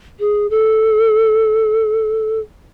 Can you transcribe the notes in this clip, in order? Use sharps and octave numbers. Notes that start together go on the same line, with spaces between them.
G#4
A4